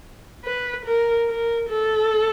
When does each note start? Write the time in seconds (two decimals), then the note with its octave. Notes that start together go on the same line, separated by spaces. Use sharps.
0.45 B4
0.86 A#4
1.29 A#4
1.70 A4